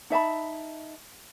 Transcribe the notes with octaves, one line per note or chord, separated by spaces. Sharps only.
D#4 E5 A5 B5